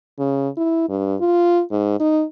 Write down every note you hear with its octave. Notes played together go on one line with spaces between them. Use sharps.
C#3
E4
G2
F4
G#2
D#4